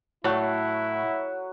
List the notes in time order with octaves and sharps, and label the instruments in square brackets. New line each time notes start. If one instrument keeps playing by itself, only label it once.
[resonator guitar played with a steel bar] A2 [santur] F#3 F#5 [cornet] E4